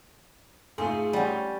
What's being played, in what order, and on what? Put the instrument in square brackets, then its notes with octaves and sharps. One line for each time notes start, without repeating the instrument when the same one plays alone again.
[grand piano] G#2 A3 F4 [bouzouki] G#4 [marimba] A4
[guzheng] G3 C#4 [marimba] F#5 G5 B5